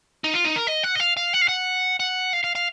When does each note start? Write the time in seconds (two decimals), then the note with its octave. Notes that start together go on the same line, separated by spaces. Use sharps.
0.24 D#4
0.34 F4
0.44 D#4
0.56 A#4
0.67 D#5
0.83 F#5
0.95 D#5
1.00 F5
1.17 F5
1.33 F#5
1.41 F5
1.48 F#5
2.00 F#5
2.33 F5
2.44 F5
2.55 F5